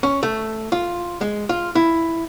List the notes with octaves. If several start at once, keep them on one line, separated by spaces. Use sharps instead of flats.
C#4
A3
F4
G#3
F4
E4